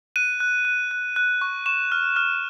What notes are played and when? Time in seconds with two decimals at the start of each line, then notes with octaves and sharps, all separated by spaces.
0.16 F#6 D#7
0.40 F#6
0.65 F#6
0.91 F#6
1.16 F#6
1.41 C#6
1.66 C#6 E7
1.92 F6
2.16 F6